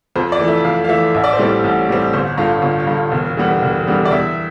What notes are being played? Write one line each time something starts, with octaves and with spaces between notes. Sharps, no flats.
F2 C5
D5
E3 A3
E5
F2 F5
F5
E3 A3 E5
A1 E5
D5
C5
A2 G3 C4 D5
A1
A2 G3 C4
G1 C5
G2 D3 F4
G1 F4
F4
G2 D3
E1
E2 D3 G3 B3
E1
E2 D3 G3 B3
D5
E2 E5